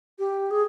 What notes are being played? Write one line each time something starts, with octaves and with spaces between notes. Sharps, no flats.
G4
G#4